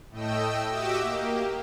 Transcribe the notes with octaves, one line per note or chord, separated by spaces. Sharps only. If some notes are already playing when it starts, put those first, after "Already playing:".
A2 A3 D#5 G5 E6
F#4 G4 D#5 E5 D6 E6
A#3 G4